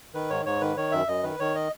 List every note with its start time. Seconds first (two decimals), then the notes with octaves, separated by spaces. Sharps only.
0.14 D#3 B4
0.30 G#2 C#5
0.45 G#2 C#5
0.61 D#3 B4
0.77 D#3 C#5
0.92 F#2 E5
1.07 F#2 D#5
1.23 D#3 B4
1.40 D#3 C#5
1.55 D#5